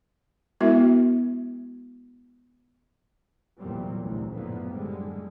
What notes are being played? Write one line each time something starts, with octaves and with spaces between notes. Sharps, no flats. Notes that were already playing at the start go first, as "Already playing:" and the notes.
G#3 B3 E4 F#4 A#4 E5
F1 E2 A#2 F#3 G3 C4
A1 D2 A2 C3
F#1 A2 D3 F3 A#3 B3
F#1 D3 G3 G#3